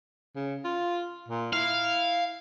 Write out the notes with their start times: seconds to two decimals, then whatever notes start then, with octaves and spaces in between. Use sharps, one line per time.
0.36 C#3
0.64 F4
1.29 A#2
1.53 E4 F5